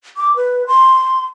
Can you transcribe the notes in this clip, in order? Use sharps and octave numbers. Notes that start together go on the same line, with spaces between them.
D6
B4
C6